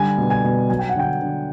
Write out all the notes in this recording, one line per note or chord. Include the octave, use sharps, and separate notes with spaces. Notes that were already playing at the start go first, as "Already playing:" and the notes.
Already playing: D3 G3 G#5
B2
G#5
B2
F#3 G#5
G5
F#5
D3 G5
D3